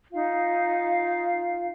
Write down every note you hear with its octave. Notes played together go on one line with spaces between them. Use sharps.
D#4 F4 F5